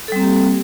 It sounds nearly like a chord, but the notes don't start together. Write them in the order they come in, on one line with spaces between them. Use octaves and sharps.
A4 G3 C4 A#3 G4